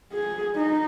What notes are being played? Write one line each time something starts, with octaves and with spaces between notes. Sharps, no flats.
G#4
D#4